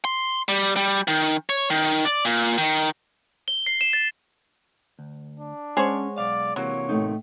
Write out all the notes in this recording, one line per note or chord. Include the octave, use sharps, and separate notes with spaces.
C6
G3
G3
D#3
C#5
D#3
D5
A#2
D#3
G7
C7
E7
A6
D2
D4
G#3 C#4 G#4 C5 C#5 F#5
B1 D5 F5
C3 E3 F#3 A#3 C#5
A2 A3 D#4